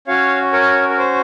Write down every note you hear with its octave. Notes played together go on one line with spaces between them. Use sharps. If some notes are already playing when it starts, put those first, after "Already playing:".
C#4 F#4 C#5 F5
A#4 C#5
A#4
C5